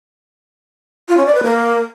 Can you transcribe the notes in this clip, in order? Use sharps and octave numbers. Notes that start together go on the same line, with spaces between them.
F4
C#4
D5
B4
A#3